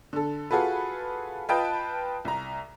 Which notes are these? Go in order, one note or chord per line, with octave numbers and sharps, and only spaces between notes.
D3 A4
F4 F#4 G#4 A4 B4
F4 B4 D#5 G5 A5
C2 A#5